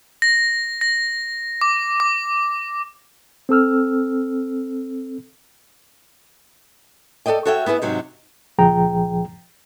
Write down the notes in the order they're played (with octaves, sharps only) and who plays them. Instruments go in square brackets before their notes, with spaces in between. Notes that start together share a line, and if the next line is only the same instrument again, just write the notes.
[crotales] A#6
A#6
D6
D6
[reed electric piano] C4 A4 E6 F6
[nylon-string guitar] A4 B4 D5 D#5 G5
F#4 A4 C#5 E5 G5
B3 E4 G#4 B4
G#2 C3 F#3
[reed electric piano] C#2 A#2 F3 G#4 G5 A#5